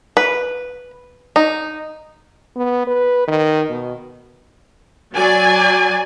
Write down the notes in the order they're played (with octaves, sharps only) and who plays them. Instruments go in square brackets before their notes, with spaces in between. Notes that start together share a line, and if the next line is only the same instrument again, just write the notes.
[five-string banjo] B4
D#4
[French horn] B3
B4
D#3
B2
[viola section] F#3 D5 G#5